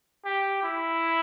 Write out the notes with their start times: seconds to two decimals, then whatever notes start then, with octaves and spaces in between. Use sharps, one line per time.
0.25 G4
0.63 E4